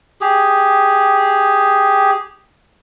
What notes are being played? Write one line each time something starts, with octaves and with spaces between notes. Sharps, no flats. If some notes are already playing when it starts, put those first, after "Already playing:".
G4 G#4